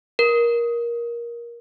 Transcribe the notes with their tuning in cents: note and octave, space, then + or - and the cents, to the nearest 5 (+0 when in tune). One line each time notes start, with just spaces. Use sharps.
A#4 +15